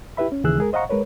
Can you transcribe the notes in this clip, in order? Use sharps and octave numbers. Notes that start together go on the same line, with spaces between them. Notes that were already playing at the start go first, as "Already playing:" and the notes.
E4 G4 B4 E5 B5
C#4
D#2 C#3 E3 G#4 E6 F#6
G#3 G#4 A#4
C5 D#5 F5 F#5 A#5 C#6
G#3 A#4 B4 C#5